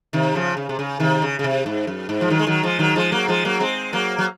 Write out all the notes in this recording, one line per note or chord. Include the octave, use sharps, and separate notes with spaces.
C3 D#3
C#3 F3
C#3
C3
C#3
C3 D#3
C#3
C#3
C3
G#2
F#2
G#2
F3
D#3 F#3
G#3
D#3 F#3
F3 G#3
D#3 F#3
F3 G#3
F#3 A#3
F3 G#3
F#3 A#3
G#3 C4
F#3 A#3
F#3